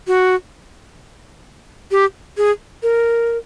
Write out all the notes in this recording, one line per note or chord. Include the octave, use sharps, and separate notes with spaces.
F#4
G4
G#4
A#4